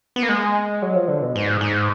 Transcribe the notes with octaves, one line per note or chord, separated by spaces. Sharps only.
B3
A#3
G#3
F#3
F3
D3
B2
G#2
G#2